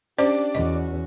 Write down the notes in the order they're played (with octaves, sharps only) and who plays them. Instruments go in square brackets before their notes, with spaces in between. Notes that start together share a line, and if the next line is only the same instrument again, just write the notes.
[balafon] C#4 C5 [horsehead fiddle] D4 G4 [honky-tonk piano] D5
[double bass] E2 [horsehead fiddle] C#4 F#4 [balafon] D#5